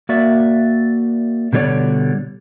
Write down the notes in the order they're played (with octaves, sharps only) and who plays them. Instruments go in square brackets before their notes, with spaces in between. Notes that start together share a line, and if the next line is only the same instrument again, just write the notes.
[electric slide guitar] A#3 F#4 D5 E5
B2 D3 G3 C4 C#5 D5